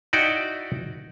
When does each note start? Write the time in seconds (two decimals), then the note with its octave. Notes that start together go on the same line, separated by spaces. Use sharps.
0.13 D#4 E4 F#4 D5 F5 G5